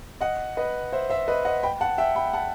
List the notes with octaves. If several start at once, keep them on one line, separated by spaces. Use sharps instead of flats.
D#5 F#5
B4 D#5
C5 E5
C5 E5
B4 D#5
D#5 F#5
G5 B5
F#5 A5
E5 G5
G5 B5
F#5 A5